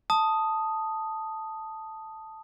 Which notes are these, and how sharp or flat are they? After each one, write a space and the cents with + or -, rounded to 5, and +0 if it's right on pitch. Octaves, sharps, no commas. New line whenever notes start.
A5 +0 D#6 +0